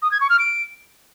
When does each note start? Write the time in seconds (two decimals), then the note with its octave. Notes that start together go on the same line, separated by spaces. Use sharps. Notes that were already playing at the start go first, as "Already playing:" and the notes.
0.02 D#6
0.11 G#6
0.21 C#6
0.30 F6
0.39 D7